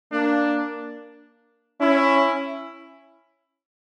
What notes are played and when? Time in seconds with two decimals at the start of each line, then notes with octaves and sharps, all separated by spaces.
0.12 A#3 D4
1.80 C#4 E4